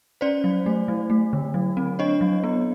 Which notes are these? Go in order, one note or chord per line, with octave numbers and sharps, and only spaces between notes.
C#4 C5 D5
F#3
A3
F#3
A3
D3
F#3
C4
D4 C#5 D#5
F#3
B3